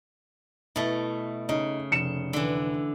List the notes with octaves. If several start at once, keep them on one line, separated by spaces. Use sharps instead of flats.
B2 A3 E4
C#3 D#4
F1 C#7 E7
D3 E3